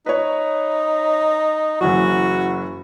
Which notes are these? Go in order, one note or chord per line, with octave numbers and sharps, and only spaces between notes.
D#4 B4 C#5
F#1 E3 F#3 F#4